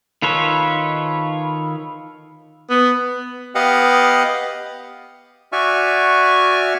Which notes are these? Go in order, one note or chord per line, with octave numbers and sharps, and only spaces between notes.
D#3 F4 A4 B4 C#5
B3
B3 G4 D#5 F5 F#5
F#4 D5 E5 G#5 C#6 F6